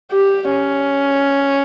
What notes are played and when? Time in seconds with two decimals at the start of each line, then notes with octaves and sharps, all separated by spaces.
0.11 G4
0.51 C#4